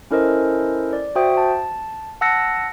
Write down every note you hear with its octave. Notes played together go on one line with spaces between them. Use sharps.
C#4 E4 A4 A#4 C5 D#5
D5
F#4 C5 E5 G5 D#6
A5
F#5 A5 E6 F#6 A#6 C#7